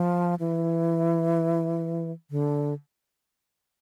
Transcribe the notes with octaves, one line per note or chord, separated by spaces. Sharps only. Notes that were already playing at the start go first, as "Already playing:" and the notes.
Already playing: F3
E3
D3